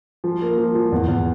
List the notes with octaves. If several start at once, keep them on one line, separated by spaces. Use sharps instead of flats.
F3
A#3
F3
F3
E2
E2